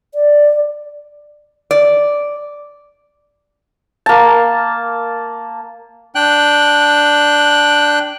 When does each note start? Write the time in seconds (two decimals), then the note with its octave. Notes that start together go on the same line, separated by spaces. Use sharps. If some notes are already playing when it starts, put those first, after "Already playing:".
0.14 D5
1.71 D5
4.06 A#3 A5
6.15 D4 G5 F#6